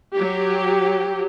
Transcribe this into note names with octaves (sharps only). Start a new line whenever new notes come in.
F#3 G4